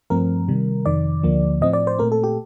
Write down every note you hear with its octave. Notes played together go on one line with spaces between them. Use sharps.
G2 F3 A3 C4 A#4
C3 D#3 G3
F2 C3 D#3 D5
D2 D3 F3 A#3
A2 F3 C4 D#5
D5
C5
A#2 A3 C4 A#4
A4
G4